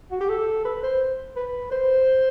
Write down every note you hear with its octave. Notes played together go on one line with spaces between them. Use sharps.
F#4
G4
A4
B4
C5
B4
C5